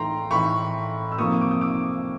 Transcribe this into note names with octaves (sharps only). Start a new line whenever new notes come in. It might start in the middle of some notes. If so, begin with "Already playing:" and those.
Already playing: A2 E3 A3 G5 A#5 C6
A2 E3 A3 B5 C#6
E6
C3 F3 A#3 C#6 D#6
D6
D#6
D6 E6